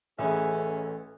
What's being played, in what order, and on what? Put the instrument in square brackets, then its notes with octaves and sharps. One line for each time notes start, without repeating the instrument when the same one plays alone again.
[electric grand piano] A1 [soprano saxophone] C#4 [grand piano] G#4 B4 E5 [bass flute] A4